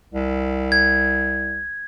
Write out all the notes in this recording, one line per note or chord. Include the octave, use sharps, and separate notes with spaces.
C2
G#6